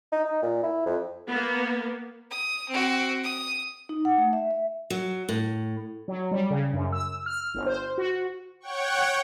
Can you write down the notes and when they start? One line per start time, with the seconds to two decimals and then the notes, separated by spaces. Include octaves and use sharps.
0.12 D#4
0.25 D#4
0.42 A#2
0.63 E4
0.86 F2
1.28 A#3 B3
2.31 D#6
2.69 C4 F#4
3.23 D#6
3.89 D#4
4.05 F#5
4.18 A3
4.33 E5
4.51 E5
4.90 F#3
5.29 A2
6.08 F#3
6.31 G3
6.50 C#3
6.73 F#2
6.92 E6
7.26 F6
7.54 G1
7.66 C5
7.98 F#4
8.60 C#5 F#5 G5 C#6